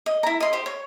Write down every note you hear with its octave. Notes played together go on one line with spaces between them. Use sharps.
D#5
E4 A#5
D#5 C6
G4 C5
C#5